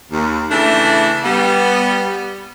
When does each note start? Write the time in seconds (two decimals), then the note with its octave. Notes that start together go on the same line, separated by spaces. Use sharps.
0.12 D#2
0.51 C#3 E3 A3 D4
1.24 G3 B3